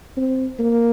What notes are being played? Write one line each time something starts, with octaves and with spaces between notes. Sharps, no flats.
C4
A#3